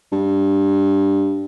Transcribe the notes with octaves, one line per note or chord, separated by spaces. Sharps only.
G2